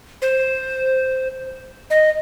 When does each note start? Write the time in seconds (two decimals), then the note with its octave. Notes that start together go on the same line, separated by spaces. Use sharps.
0.22 C5
1.90 D#5